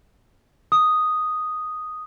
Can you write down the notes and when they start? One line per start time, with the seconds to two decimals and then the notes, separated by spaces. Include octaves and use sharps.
0.72 D#6